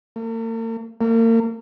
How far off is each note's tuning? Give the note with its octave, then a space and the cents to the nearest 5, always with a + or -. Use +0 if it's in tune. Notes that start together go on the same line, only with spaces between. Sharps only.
A#3 -45
A#3 -35